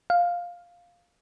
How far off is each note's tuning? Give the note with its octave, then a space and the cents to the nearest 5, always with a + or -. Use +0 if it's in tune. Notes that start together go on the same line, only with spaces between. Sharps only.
F5 +5